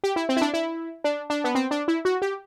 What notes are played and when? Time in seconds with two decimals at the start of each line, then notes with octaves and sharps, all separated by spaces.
0.04 G4
0.16 E4
0.29 C4
0.37 E4
0.41 D4
0.54 E4
1.04 D4
1.30 D4
1.44 B3
1.55 C4
1.71 D4
1.88 E4
2.05 F#4
2.22 G4